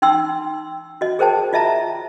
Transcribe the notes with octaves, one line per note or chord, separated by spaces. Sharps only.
D#4 G5 C6 E6
F#4 D#5
G#4 A#4 C5 G5 A5
F4 D#5 E5 A5 A#5